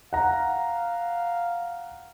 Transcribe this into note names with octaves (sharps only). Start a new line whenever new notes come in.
F5 F#5 A#5